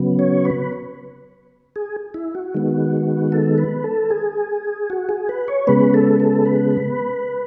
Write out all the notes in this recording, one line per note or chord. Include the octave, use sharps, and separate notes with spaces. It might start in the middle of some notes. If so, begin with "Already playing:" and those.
Already playing: C#3 F#3 B3
C#5
B4
G#4
E4
F#4
D#3 G#3 B3
A4
B4
A4
G#4
F#4
G#4
B4
C#5
C#3 G#3 B3 B4
A4
A4
B4